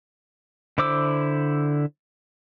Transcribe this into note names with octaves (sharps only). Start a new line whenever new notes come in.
D3 E4 C5 D6 E6